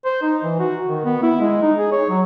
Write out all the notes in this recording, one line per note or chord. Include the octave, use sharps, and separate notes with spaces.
C5
D#4
E3
F#4
D#3
B3
E4
G#3
D#4
G#4
C#5
F#3